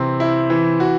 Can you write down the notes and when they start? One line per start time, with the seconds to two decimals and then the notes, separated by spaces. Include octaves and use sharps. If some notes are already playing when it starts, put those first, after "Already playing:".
Already playing: C3 E3 C4
0.20 E4
0.50 E3
0.80 F#4